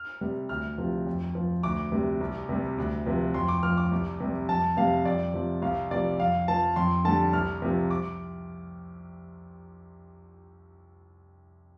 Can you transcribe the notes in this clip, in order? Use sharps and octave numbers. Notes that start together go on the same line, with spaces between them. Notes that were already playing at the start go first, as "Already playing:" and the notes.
Already playing: F6
C3 G3
D2 F6
C3 F3
F2
F3
D2 D6
C3 G3
C2
C3 G3
D2
C3 F3
F2 C6
D6
F3 F6
D6
C2
C3 G3
F2 A5
C3 G3 F5
F2 D5
C3 F3
C2 F5
C3 F3 D5
F2 F5
F3 A5
F2 C6
D3 G3 A5
C2 F6
C3 F3
D6